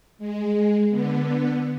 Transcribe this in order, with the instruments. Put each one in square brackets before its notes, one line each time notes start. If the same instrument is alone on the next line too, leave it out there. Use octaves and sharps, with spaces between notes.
[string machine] G#3
D3 B3